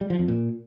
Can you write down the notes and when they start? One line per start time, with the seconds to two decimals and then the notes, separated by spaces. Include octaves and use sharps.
0.01 G3
0.10 F3
0.19 F2
0.28 A#2